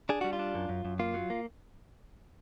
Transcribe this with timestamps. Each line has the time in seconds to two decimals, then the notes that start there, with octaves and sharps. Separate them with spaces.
0.09 D4 G#4
0.21 G3 F#4
0.33 F4
0.39 D4
0.55 F#2
0.69 F#2
0.85 F#2
0.99 A#3 F4
1.14 F#3
1.30 A#3